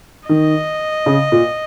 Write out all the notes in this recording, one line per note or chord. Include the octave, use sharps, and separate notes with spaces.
D#3 D#5
C#3
A#2